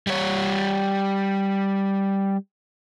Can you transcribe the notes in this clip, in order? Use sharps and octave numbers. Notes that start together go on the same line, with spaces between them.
G3 C#5